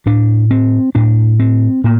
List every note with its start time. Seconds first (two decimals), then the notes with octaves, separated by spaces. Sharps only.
0.06 A2 D4
0.51 C4
0.95 A2 D4
1.40 C4
1.84 A2 A#3